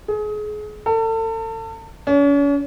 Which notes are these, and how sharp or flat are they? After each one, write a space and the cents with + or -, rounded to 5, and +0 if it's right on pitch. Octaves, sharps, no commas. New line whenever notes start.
G#4 +30
A4 +35
C#4 +40